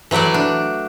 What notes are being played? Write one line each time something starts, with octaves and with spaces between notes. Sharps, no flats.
E3 F#3 A3 D5 F#5
D4